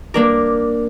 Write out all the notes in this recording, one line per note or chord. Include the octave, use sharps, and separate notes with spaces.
A#3 D4 A#4